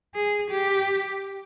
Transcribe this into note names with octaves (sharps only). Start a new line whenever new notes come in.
G#4
G4